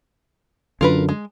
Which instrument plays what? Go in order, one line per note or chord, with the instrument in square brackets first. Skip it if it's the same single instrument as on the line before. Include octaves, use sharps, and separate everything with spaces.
[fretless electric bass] F#2 D3 [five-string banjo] F4 A#4 B4
[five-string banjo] G#3